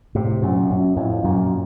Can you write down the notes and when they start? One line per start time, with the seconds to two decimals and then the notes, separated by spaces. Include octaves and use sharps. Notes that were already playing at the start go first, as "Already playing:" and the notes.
0.15 A2 C3
0.42 F#2 A#2
0.70 F#2
0.96 F2 A2
1.24 F#2 A#2